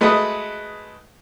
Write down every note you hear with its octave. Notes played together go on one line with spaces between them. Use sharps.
G#3 A3 F#4 B4 D#6